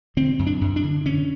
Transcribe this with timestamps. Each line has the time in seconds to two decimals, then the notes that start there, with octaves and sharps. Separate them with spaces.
0.17 D3 C4
0.39 F#2
0.47 D4
0.61 F#2
0.76 D4
0.83 D3
1.05 D3 C#4